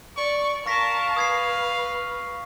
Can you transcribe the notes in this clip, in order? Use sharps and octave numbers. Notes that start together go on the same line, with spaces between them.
D5 C#6
A#4 F5 A5 C#6 A#6 B6
B4 D#6 G#6 C7